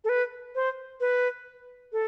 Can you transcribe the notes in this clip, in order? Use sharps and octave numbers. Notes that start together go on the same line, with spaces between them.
A4
B4
C5
B4
A4